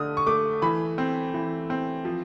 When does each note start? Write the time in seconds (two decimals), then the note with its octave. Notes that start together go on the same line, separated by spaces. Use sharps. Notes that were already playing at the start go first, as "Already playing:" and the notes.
Already playing: D3 A3 D#6 F6
0.17 C#6
0.26 A3 D6
0.62 E3 B5
0.98 C4
1.34 E3
1.70 C4
2.05 F3